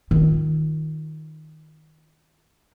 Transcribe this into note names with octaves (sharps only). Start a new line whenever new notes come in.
D#3 F4